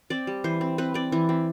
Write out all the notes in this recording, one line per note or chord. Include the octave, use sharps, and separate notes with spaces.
C4 D5
G3
E3 C5
C4
C4 B4
C4 D5
E3 E4
C4